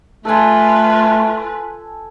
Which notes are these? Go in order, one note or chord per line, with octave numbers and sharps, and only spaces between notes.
A3 F4 A4 B4 G#5